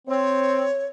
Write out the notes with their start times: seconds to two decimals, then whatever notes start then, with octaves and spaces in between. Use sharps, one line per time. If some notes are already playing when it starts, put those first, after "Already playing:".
0.08 C4 C#5